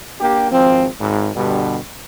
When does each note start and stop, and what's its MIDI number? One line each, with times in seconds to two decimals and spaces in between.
0.19 0.48 58
0.19 0.48 62
0.19 0.48 67
0.52 0.86 32
0.52 0.86 53
0.52 0.86 60
0.99 1.28 32
0.99 1.28 44
1.34 1.77 43
1.34 1.77 47
1.34 1.77 50
1.34 1.77 55